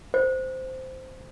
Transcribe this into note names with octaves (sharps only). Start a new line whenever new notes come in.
C5